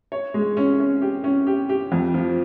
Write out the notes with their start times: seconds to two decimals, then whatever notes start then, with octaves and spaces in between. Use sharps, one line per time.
0.12 C#5
0.34 G#3
0.57 C#4
0.80 C#4
1.02 G4
1.24 C#4
1.47 G4
1.69 G4
1.92 F2
2.14 F3